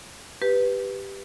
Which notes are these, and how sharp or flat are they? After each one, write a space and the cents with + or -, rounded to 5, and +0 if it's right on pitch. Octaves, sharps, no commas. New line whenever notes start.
G4 +0 B4 +0